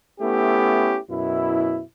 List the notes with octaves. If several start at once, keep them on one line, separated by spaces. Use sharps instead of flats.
A3 B3 C#4 E4 G4
F#2 B2 E4